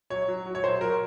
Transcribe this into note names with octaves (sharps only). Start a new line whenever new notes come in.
F#3 C#5
F#3
F#3
C#5
F#3 C5
F#3 A#4